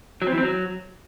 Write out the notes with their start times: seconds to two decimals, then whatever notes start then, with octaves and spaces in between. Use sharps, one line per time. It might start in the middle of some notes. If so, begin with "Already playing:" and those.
0.22 F#3
0.27 C4
0.32 E3
0.38 C4
0.43 F#3